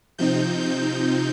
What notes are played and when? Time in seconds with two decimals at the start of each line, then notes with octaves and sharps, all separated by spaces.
0.18 C3 F3 C4 D#4 G6
0.61 G6